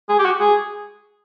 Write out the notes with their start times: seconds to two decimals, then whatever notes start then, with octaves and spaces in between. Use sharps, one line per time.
0.09 G#4
0.19 G4
0.25 F#4
0.40 G#4